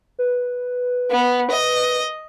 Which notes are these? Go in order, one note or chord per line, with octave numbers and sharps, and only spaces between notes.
B4
B3
D#5